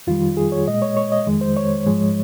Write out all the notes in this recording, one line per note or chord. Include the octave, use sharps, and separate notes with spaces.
F2 D#3 G3 F4
G#4
C#5
A#2 G#3 D#5
C#5
C#5
D#5
F2 D#3 G#3
C5
C#5
G#2 F3 G#3